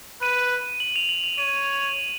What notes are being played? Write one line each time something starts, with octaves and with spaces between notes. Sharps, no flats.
B4 D#7
F#7
F7
F#7
F7
C#5 D#7